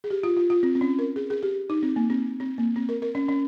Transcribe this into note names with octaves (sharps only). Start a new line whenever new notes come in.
G#4
G4
F4
F4
F4
C4
C4
C#4
A#4
G#4
G#4
G4
D#4
C4
A#3
C4
C4
A#3
C4
A#4
A#4
C#4
C#4